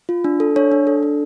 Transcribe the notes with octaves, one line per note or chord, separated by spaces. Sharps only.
F4
D4
A4
D4 C#5
D4
A4
D4